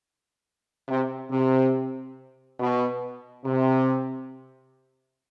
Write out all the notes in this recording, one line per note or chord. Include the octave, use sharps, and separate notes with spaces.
C3
C3
B2
C3